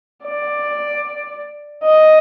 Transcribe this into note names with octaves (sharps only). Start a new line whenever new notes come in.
D5
D#5